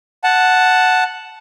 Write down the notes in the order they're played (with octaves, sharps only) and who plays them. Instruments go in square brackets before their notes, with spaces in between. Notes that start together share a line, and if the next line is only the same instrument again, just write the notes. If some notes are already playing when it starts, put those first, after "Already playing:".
[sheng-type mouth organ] F#5 A5